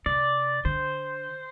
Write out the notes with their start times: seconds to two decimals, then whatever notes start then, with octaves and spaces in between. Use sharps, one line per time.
0.06 C3 D5
0.65 D3 C5